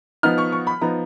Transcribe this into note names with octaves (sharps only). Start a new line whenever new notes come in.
F3 B3 D#4 F6
C#6
C#6
B5
F3 B3 D#4 A#5